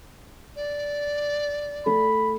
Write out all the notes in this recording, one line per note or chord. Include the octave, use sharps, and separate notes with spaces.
D5
A3 A4 B5